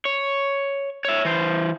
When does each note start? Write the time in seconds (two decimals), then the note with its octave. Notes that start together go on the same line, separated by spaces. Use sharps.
0.05 C#5
1.05 C#5 E5
1.25 E3 C5